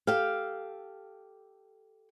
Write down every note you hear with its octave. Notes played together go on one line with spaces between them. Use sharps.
G4 A4 F5